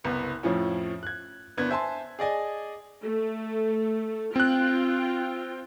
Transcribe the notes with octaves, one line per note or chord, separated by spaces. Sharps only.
F#1 C2 B3
F2 A2 F3 C#4
F#6 G#6
F#1 B3 D4 G#6
C5 E5 G#5 A5 C6
G#4 D5 D#5 G#5
A3
C4 F4 G5 F#6